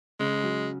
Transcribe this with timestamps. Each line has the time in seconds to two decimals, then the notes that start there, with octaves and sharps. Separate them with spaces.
0.20 C#3 G#3
0.43 F#3